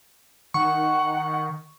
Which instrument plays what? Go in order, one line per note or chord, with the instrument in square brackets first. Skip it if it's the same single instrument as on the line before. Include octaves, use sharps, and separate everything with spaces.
[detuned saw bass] D#3 [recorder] F#5 [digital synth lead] C#6